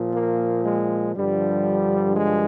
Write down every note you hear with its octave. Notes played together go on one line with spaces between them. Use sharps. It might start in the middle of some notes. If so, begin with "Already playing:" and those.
Already playing: A#2 F3
A#3
G#3
G2 D3 F3 G3
G#3